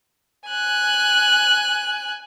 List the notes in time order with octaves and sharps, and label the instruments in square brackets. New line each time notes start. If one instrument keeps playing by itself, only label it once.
[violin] G#5 F#6